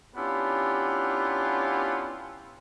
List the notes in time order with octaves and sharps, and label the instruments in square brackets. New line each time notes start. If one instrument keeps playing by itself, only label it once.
[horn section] B3 C#4 D4 E4 F4 G4